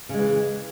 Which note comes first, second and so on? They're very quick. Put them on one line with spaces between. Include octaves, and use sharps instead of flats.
C#3 G#3 E3